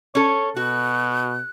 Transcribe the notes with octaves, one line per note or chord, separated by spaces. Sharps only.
C#4 A4 C#5
B2 F#4 F#6